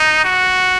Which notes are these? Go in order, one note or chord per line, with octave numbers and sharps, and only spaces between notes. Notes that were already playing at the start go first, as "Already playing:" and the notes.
Already playing: D#4
F#4